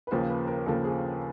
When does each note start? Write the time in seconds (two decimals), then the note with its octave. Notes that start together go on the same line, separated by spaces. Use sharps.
0.07 B4
0.11 D#2 C#3 F3 A#3 C5
0.30 B4
0.47 A#4
0.66 D#2 C#3 F3 A#3 A4
0.84 G#4